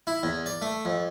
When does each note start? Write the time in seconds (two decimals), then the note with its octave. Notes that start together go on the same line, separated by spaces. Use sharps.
0.07 E4
0.23 E2
0.46 D5
0.62 A3
0.85 F2